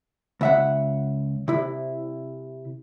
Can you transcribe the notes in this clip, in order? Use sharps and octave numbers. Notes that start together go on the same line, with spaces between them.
C#2 E5 F#5
C3 E4